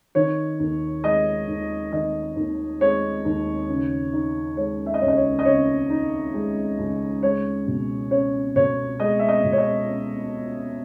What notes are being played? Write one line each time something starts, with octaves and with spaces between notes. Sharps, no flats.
D#3 C#5
D#2
G#3 D#5
D#2
D#3 D#5
D#2
G#3 C#5
D#2
C#3
D#4
G#3 C#5
E5
D#5
C#2 C#5
D#5
C#5
D#5
C#3 C#5
D#4
G#3
C#2
G#3 C#5
B2
C#4 C#5
B2 C#5
G#3 D#5
E5
D#5
B2
C#5
D#5
C#4